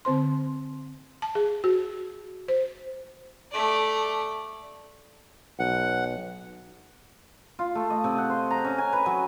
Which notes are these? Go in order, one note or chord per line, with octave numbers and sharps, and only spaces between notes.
D3 C4 C5 C6
A5
G#4
F#4
C5
A3 D5
B1 F#5
F4
A3
D#5
C3
F#5
C5
A#5
C#4
G#5
B4
F#3